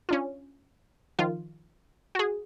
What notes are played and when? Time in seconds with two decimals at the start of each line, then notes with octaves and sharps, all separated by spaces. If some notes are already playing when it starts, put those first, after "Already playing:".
0.09 C#4 D4 F4
1.19 D#3 F3 F4
2.15 F#4 G#4